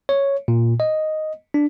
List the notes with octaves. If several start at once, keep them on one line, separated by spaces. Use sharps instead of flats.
C#5
A#2
D#5
D4